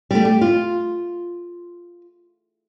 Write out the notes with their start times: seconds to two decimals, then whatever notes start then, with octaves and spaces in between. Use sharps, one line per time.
0.11 G3 A3
0.25 G4
0.41 F4